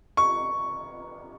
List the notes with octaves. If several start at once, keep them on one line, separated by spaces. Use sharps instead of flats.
C#6